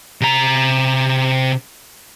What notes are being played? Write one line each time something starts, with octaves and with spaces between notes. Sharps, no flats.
C3 A#5